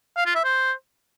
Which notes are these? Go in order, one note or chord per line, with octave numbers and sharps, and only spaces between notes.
F5
F4
E5
C5